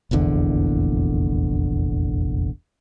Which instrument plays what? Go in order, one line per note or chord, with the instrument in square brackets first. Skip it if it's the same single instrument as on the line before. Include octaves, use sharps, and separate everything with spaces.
[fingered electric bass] F1 A#1 E2 D3